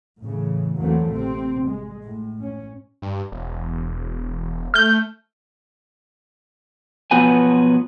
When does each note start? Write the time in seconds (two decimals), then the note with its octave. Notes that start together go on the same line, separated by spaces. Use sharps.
0.23 A2 C#3 E3
0.79 E2 E3 F#3 A3 A#3 C4
1.11 A1 A2 C3 C4
1.68 G#3
2.03 A2
2.42 C#4
3.02 G2
3.32 E1
4.74 A3 F6 G6
7.11 B2 F3 F#3 B3 B4 G#5